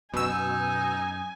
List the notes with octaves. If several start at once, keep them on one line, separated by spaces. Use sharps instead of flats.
F#2 B2 D#4 G#5 E6